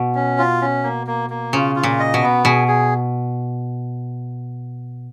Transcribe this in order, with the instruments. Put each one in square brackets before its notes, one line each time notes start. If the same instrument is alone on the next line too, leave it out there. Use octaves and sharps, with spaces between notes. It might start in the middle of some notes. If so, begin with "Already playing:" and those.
Already playing: [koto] B2
[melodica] C#4
F4
C#4
A#3
A#3
A#3
[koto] C#3 [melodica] F4
[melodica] F4
[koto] A#2
[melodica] D#5
[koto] B2
[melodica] B3
[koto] B2 [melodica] G#4
[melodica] G#4